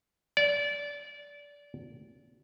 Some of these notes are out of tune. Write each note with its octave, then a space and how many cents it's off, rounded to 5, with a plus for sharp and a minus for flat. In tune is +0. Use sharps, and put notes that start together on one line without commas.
D5 -25